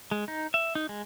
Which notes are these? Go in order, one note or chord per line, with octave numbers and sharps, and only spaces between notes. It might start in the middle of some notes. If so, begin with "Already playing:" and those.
G#3
D#4
E5
D#4
G#3